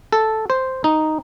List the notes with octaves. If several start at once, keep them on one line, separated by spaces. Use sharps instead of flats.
A4
C5
D#4